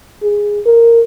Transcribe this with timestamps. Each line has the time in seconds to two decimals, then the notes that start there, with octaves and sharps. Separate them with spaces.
0.23 G#4
0.66 A#4